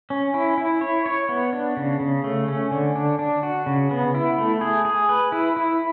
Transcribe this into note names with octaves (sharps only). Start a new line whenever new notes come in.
C#4
E4
E4
C#5
C#5
B3
D4
C#3
C#3
A3
C#4
D3
D4
D4
F#4
C#3
B3
E4
A3
G#4
G#4
B4
E4
E4